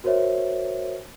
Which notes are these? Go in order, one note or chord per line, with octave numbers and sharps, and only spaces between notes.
F#4 A#4 C5 C#5 E5